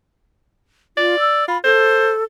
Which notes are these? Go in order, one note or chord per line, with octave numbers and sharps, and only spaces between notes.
F4 D5
E6
F4 B5
A4 C5